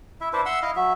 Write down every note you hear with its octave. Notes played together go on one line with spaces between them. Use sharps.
E4 E5
D4 E4 B4 C5
E5 F#5 C6 E6
E4 D#5 F5
F#3 E5